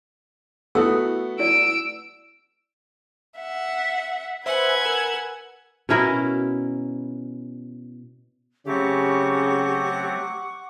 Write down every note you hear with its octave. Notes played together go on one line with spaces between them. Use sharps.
A3 B3 E4 F#4 A4 E6
E4 D5 E6 D7
E5 F#5
B4 C5 E5 F#5 G#5 B5 G#6
A#4 E6
B2 C#4 E4 A#4
C#3 F#3 A3 C4 G4 F#5 C#6 D6